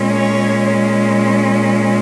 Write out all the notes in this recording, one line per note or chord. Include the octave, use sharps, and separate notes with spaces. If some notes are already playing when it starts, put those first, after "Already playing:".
Already playing: A#2 G#3 C#4
C#5